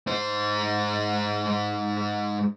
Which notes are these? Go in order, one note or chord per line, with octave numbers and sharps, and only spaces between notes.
G#2 C5